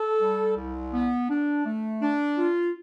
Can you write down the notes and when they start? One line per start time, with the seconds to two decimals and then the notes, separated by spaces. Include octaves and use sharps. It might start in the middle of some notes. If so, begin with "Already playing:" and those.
Already playing: A4
0.21 G3
0.57 C2
0.93 B3
1.29 D4
1.65 A3
2.02 D4
2.38 F4